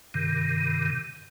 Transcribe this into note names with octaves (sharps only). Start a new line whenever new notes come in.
G2 C3 D#3